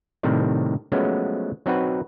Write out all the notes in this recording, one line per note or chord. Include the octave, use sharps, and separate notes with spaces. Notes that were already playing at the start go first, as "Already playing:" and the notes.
A2 C3 D#3 G3
F3 F#3 G#3 A3 B3 C#4
F#3 C4 D#4 F#4 B4